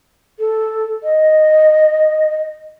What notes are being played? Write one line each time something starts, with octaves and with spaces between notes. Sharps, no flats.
A4
D#5